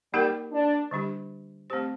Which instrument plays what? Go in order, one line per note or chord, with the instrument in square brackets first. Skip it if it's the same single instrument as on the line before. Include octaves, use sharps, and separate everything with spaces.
[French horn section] G3 [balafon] A#3 D#4 G4 A#4
[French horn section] D4
[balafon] D3 G3 D4 G4
A3 C4 G4 C5